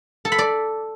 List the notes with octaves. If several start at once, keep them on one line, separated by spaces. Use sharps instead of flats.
A4
B5
D5